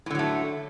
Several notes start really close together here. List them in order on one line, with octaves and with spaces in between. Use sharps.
A2 D3 F#3 A3